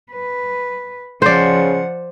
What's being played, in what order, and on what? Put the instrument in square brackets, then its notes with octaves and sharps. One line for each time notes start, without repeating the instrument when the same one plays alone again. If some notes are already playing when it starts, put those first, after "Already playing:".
[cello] B4
[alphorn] C#3 [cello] F3 F#5 [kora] C5 D5